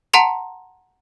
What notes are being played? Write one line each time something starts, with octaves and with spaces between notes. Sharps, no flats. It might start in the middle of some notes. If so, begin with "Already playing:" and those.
F#5 A5 A#5 C6 C#7